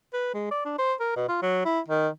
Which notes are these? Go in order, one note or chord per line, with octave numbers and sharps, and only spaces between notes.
B4
G#3
D5
D4
C5
A#4
B2
F4
F#3
E4
D#3